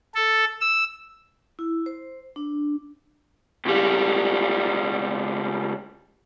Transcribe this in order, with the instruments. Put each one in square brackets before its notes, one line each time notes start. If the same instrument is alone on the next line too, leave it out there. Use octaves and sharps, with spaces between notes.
[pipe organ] A4
E6
[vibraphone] E4
C5
D4
[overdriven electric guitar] C#2 G3